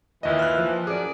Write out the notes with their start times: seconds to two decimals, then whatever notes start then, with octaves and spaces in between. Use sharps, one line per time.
0.23 D#2 A#2 E3 D#5
0.39 F6 F#6
0.58 F3
0.87 F#2 G#4 D5